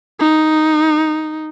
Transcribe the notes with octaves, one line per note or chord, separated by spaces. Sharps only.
D#4